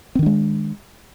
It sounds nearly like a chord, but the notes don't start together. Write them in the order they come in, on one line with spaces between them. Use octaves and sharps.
C4 D#3 D4 G#3